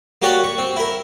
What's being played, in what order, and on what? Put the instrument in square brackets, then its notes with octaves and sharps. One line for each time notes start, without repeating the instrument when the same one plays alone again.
[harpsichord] A#3 F#4 G4 C#5 D5 F#5
C#6
C4
E4 A#4